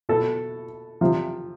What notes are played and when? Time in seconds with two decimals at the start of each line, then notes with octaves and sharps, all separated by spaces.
0.09 B2 A4
1.01 C3 F3